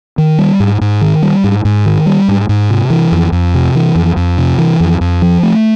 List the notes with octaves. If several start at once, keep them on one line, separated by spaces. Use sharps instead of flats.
D#3
G3
G#2
G#2
D#3
G3
G#2
G#2
D#3
G3
G#2
G#2
C3
E3
F2
F2
C3
E3
F2
F2
C3
E3
F2
F2
F3
A3